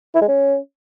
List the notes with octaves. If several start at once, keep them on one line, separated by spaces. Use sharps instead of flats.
E4
G#3
C#4